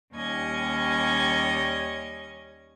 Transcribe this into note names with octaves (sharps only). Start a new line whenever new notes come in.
D#2 G3 C#4 D#5 G#6